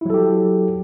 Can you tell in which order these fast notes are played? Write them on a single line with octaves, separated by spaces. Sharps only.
E4 F#3 A4 G4